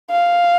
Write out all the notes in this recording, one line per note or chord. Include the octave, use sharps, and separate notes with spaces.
F5